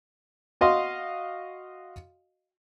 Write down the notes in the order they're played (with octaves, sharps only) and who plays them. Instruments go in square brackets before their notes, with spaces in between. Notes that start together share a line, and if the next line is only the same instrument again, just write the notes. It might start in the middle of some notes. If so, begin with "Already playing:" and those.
[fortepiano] F#4 D#5 F5 C6